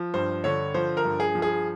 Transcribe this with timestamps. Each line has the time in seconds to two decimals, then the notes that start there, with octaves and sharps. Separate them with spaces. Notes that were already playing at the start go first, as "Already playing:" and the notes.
Already playing: F3
0.14 G2 C5
0.44 D3 C#5
0.74 F3 C5
0.97 A#4
1.05 G2
1.20 G#4
1.35 F3
1.42 G#4